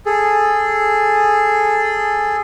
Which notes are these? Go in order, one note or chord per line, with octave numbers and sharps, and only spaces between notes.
G#4 A4